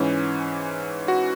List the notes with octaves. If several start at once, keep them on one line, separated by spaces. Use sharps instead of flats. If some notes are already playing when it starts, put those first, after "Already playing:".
Already playing: G#2 E3 C#4
F#4